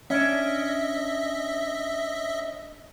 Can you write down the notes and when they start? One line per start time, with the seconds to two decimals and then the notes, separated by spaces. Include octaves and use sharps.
0.10 C#4 D4 D#5 E5